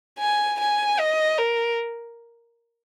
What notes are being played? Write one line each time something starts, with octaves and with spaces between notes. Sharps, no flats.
G#5
G#5
D#5
A#4